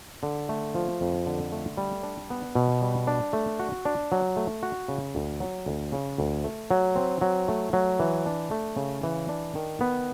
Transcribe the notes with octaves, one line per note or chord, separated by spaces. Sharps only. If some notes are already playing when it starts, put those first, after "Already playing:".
D3
A3
F3
F2
D3
A3
G3
D4
B3
B2
G3
D4
A3
F#4
D4
F#3
A3
F#4
C#3
D2
F#3
D2
C#3
D2
A3
F#3
C4
F#3
A3
F#3
E3
D4
A3
C#3
E3
D4
D#3
B3